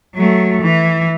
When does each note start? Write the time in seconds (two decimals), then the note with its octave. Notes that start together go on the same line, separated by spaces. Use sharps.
0.15 F#3 A3
0.62 E3